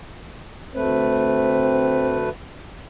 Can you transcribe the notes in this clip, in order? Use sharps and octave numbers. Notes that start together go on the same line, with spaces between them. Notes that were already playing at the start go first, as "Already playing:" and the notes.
D2 A3 C4 B4